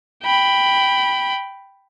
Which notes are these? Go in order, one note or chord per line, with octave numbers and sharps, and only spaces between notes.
G5 B5